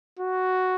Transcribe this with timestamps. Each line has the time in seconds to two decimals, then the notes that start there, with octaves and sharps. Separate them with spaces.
0.19 F#4